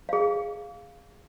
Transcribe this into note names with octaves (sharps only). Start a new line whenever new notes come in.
G#4 F5